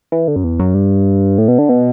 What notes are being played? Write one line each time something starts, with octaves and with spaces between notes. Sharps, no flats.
E3
D3
F#2
E2
F#2
G2
A2
B2
D3
B2